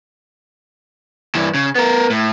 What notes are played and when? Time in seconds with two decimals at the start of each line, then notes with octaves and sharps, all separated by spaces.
1.35 G2 E3
1.54 C#3
1.75 B3 A#4
2.10 A2